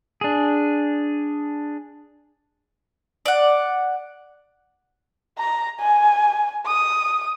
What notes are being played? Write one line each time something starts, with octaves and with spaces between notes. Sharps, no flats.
D4 G#4
D5 F#5
A#5
G#5
D#6